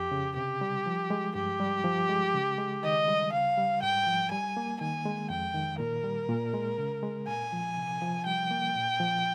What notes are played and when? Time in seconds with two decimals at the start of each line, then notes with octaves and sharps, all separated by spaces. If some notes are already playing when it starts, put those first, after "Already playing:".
Already playing: F2 G4
0.11 C#3
0.36 C3 G4
0.61 G3
0.86 F3
1.10 G#3
1.35 G2 G4
1.60 G3
1.84 F3
2.09 G#3
2.34 C#3
2.58 G#3
2.83 D#3 D#5
3.08 G3
3.33 C#3 F5
3.58 G3
3.82 G#2 G5
4.06 F3
4.31 G3 G#5
4.57 A#3
4.81 D#3 G#5
5.05 G#3
5.30 F2 G5
5.55 D#3
5.80 A#2 A#4
6.04 G3
6.29 A#2
6.53 G#3
6.78 C#3
7.03 G#3
7.27 A#2 G#5
7.53 F3
7.77 C3
8.02 F3
8.26 G3 G5
8.51 A#3
8.75 A#2
9.00 F3